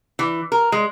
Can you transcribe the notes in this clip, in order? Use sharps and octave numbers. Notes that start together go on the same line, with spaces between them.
E3
A#4
G#3